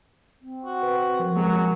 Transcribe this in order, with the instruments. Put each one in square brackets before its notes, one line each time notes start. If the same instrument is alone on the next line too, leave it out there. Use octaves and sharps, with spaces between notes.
[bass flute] C4
[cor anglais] F#4
[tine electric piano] B4
F3 A#4
[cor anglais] F#3 [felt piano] G#3